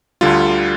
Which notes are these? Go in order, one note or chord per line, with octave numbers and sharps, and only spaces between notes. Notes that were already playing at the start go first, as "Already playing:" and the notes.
D2 D3 G3 F4